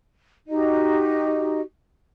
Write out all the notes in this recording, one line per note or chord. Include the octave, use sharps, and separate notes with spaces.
D#4 F#4 G4 D#5